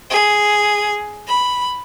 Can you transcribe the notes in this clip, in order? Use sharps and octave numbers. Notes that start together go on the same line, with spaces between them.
G#4
B5